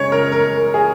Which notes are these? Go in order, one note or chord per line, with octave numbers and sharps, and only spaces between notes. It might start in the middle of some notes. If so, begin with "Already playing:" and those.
Already playing: C#3 G#3 C#5
A#4
A#4
G#4